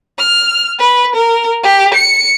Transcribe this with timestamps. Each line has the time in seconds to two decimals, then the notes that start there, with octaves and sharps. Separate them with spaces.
0.19 F6
0.79 B4
1.15 A#4
1.63 G4
1.94 C#7